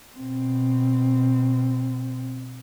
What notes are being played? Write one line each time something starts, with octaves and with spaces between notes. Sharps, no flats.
B2 C4